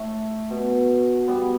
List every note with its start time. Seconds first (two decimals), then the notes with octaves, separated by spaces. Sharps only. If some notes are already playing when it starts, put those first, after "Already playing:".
Already playing: A2 A3
0.50 B2
1.28 G3 B3